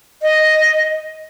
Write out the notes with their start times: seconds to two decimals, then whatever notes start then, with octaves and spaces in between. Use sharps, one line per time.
0.22 D#5